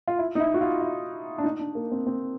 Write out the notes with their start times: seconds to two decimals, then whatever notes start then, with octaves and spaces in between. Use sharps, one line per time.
0.08 F4
0.19 E4
0.35 D#4
0.40 E4
0.54 F#4
0.61 F4
0.82 E4
1.38 D4
1.44 D#4
1.60 D4
1.75 A#3
1.92 C4
2.07 C4